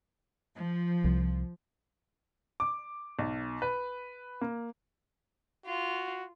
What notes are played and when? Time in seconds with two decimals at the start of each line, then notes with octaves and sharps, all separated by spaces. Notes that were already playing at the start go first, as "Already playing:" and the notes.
0.57 F3
1.04 C2
2.60 D6
3.19 B1
3.62 B4
4.41 A#3
5.66 F4 F#4